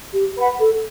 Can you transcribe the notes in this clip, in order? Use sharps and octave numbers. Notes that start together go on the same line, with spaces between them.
G4
B4 F#5 B5
A4